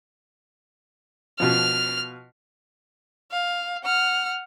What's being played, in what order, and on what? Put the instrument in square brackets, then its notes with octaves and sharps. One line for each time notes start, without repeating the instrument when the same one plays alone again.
[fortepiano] B2 F3 [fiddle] F6
[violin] F5
F#5 F6